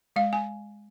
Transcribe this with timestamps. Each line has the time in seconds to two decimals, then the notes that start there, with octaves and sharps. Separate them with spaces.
0.16 G#3 F5
0.33 G#5